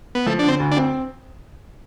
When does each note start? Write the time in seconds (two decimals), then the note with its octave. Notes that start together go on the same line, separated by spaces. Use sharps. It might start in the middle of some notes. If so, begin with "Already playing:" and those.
0.15 B3
0.26 F3 A3
0.39 D3 D4
0.48 C4
0.60 D2
0.71 D4
0.77 C4